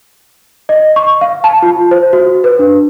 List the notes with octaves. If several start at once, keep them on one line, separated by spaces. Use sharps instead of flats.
D#5
C#6
F5
A5
F4
C5
F#4
B4
D4